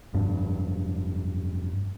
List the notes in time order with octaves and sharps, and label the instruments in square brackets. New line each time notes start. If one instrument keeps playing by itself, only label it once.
[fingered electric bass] F1 G2 D4